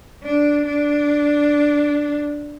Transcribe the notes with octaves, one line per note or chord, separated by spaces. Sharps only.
D4
D4